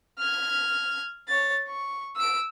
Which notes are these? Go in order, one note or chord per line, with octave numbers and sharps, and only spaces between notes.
F6 G#6
C#5 A6
C#6
E6 D7